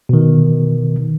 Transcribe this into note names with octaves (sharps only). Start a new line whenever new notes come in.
B2 D#3